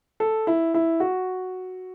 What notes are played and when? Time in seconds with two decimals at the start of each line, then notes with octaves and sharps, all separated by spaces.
0.20 A4
0.47 E4
0.74 E4
1.00 F#4